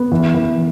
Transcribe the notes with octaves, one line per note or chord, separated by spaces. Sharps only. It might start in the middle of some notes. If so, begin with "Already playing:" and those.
Already playing: B3
E3
E3